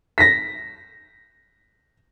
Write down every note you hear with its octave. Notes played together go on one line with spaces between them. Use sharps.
A#6 B6